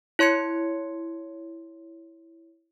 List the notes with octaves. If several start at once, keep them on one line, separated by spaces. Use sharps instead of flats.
E4 C#5 C6 G#6 C#7